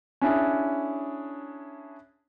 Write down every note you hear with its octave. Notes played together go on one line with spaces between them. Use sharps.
C#4 D4 E4 G#4